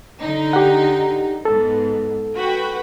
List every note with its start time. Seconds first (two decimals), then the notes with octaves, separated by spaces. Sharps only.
0.20 D3 D#4
0.53 G4 F#5
1.45 G#2 B3 A4
2.35 F#4 B4 G5